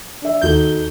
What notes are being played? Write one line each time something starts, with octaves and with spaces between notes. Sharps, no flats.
D4 E5
D#2 D#4 F#4 A4 G6